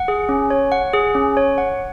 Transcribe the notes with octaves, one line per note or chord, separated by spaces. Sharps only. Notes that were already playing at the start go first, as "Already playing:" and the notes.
Already playing: F#5
G#4
C#4
C#5
F#5
G#4
C#4
C#5
F#5